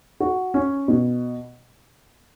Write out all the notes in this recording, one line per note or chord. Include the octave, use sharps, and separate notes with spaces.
F#4
C#4
B2